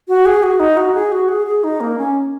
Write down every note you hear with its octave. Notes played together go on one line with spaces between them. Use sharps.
F#4
G#4
F#4
D#4
F#4
G#4
F#4
G#4
G#4
D#4
A#3
C#4